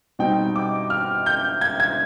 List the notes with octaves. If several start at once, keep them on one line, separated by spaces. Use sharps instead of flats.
B2 G3 C4 D#4 G5
D6
F6
G6
G#6
G#6